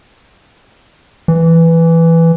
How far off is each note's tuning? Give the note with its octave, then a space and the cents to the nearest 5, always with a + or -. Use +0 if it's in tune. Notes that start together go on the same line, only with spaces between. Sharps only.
E3 +5